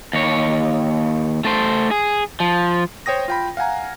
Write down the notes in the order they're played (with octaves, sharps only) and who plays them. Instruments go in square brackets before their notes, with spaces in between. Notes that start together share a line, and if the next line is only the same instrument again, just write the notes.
[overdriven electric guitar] D#2 C#5
A3 C5
G#4
F3
[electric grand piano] C5 C#5 G5 D#6 A#6
F4 G5 B5
F5 F#5 G#5 A#5